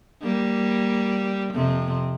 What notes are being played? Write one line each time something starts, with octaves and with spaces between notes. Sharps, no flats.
G3 A#3
F2 C3